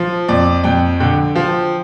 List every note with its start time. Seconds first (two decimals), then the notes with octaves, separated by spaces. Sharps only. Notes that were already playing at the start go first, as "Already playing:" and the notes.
Already playing: F3
0.28 F2 D5
0.64 F2 G5
1.00 D3 G5
1.35 F3